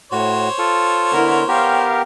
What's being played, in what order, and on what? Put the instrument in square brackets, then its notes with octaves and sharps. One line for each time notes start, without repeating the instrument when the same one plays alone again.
[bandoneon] A2 F#4 [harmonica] C5 C#5
[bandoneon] F4 A4
[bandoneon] D3 B3 [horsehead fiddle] E4 A#4
[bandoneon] B3 G4 A#4 [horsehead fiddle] F5 G5